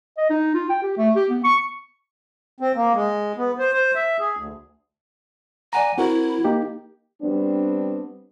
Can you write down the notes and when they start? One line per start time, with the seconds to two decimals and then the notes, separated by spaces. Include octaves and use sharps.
0.18 D#5
0.30 D#4
0.54 F4
0.70 G5
0.82 G4
0.98 A3
1.16 G4
1.30 B3
1.44 C#6
2.60 C4
2.75 A#3
2.93 G#3
3.37 B3
3.59 C5
3.73 C5
3.95 E5
4.20 G#4
4.37 D2
5.73 D5 F#5 G#5 A#5
5.98 C4 E4 F#4 A#4
6.44 A#3 D#4 G4
7.21 G3 B3 C4 D4